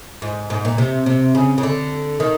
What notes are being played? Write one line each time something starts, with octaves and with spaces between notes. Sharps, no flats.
G#2
G#2
A#2
C3
C3
C#3
C#3
D3
D#3